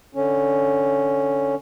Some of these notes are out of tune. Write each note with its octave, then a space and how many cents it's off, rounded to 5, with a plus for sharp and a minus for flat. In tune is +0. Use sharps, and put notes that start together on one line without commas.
D3 -5 C#4 +0